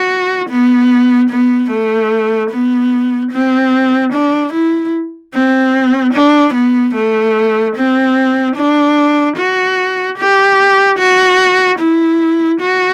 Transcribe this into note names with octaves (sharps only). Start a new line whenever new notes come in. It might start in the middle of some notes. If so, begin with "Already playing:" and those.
Already playing: F#4
B3
B3
A3
B3
C4
D4
E4
C4
D4
B3
A3
C4
D4
F#4
G4
F#4
E4
F#4